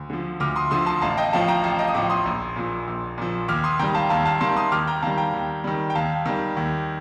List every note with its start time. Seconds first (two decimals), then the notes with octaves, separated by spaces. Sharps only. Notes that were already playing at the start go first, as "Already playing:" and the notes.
Already playing: D2
0.10 D3 F3
0.40 D2 D6 F6
0.56 C6 D#6
0.71 D3 F3 C6 D#6
0.86 A5 C6
1.02 A1 F5 A5
1.18 D#5 G5
1.33 A2 F3 F5 A5
1.48 G5 A#5
1.64 A1 F5 A5
1.79 D#5 G5
1.88 D#6
1.94 A2 F3 A#5 D6
2.10 C6 D#6
2.25 A#1
2.56 A#2 F3
2.87 A#1
3.18 A#2 F3
3.48 D#2 D6 F6
3.64 C6 D#6
3.79 D#3 G3 G5 A#5
3.94 F5 A5
4.10 D#2 F5 A5
4.25 F5 A5
4.41 D#3 G3 A5 C6
4.56 C6 D#6
4.72 D#2 D6 F6
4.87 G5 A#5
5.02 D#3 G3 F5 A5
5.17 G5 A#5
5.33 D#2
5.64 D#3 G3
5.90 G5
5.95 D#2 F5 A5
6.26 D#3 G3
6.57 D#2